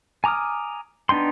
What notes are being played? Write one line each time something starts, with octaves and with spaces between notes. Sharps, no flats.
G#5 A#5 D6 D#6 F6
B3 D4 D#4 G5 C6